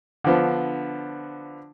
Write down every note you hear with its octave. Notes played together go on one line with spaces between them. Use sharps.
D3 F3 B3